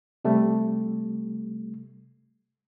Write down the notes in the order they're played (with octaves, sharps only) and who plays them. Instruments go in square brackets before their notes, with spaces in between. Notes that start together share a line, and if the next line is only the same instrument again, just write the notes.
[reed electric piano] C3 G3 A3